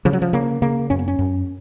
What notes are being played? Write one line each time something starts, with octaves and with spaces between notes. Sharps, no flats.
C#3 F3
F#3
F3
C#3 A#3
C#3 A#3
F#2 C#4
B3
C#4
F#2